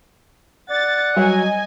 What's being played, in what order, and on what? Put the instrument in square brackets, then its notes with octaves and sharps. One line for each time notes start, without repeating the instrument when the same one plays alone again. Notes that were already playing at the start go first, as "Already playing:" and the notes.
[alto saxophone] D5 [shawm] F#5 [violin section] A6
[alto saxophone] F#3 [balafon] G3 [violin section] D#5 G#5